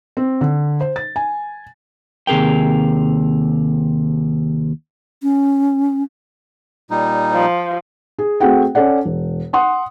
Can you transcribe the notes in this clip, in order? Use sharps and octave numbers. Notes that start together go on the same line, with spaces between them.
C4
D3
C5
A6
G#5
D#2 C3 G#4 A#4 G5
C#4
A#2 G3 D#4
F3
G#4
A3 C4 F#4 G#4 F#5 G5
C#4 A4 D5 F#5
E1
F#5 C6 D#6